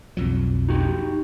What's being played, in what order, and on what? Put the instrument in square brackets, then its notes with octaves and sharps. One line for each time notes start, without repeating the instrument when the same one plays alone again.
[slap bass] B1 F2 F#3
[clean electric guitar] D#4 F#4 G4